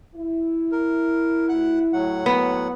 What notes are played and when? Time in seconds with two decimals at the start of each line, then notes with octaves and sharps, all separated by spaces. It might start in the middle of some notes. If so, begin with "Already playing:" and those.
0.16 E4
0.72 A#4
1.49 D2 F#5 F#6
1.93 A2 F#3 F#5
2.26 B3